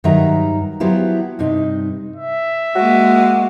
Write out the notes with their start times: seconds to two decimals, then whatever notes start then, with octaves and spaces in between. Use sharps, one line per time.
0.04 G2 D#3 F#3 D#4 E5 A#5
0.80 F3 F#3 B3 E4 G4
1.39 G2 C3 D#4
2.16 E5
2.76 G#3 A#3 F#4